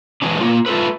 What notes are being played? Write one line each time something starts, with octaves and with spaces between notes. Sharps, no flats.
E3 F#3 G#3 C#4 D4
A#3 F4
A3 F4 A4 B4